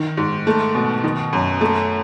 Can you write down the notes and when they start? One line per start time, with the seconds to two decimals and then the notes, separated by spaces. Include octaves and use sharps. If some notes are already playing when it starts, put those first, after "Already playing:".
Already playing: D#3
0.17 G#2
0.47 A3
0.75 B2
1.04 D#3
1.33 F#2
1.61 A3